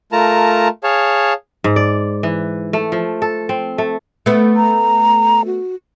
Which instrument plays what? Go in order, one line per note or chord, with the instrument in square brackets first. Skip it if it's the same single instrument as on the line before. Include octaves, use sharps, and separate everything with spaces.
[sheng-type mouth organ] A3 F4 A#4 A5 A#5
G#4 C#5 F5 A5
[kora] G#2
D5
E3
A3
F3
A4
C4
A3
[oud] A3 B3
[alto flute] A#5
F#4